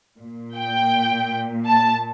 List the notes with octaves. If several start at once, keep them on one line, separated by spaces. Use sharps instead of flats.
A#2
G5
A5